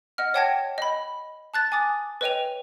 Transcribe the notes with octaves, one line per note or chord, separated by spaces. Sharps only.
D#5 F#5 F6
C#5 F#5 G5 A5 G#6 A#6
D#5 B5
A5 F#6 A6
G#5 D6 D#6 A6
B4 C#5 D#5 G5 D#7 F7